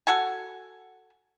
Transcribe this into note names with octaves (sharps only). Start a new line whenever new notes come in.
F#4 A4 F#5 G#5